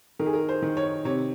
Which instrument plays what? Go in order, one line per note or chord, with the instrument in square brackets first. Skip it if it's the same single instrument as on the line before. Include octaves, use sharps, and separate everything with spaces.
[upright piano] D#3 A#4
G#4
A#4
C5
D#3
C#5
C3 C#5